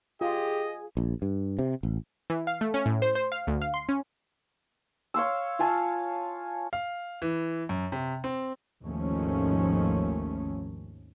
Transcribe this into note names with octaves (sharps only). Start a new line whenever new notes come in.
F4 G4 G#4 D#5
A#1
G2
C3
A1
E3
F5
A3
C#4
A2
C5
C5
F5
D2
F5
C6
C#4
C#5 F5 C6 E6
F4 F5 G#5 A5
F5
E3
F#2
C3
C4
G#1 D#2 D#3 F3 A3 C#4